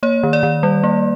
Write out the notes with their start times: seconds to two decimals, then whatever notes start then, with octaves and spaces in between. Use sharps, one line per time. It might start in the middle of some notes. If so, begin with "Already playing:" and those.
0.03 A#3 C#5
0.23 D#3
0.33 D5
0.43 D#3
0.63 G3
0.83 A#3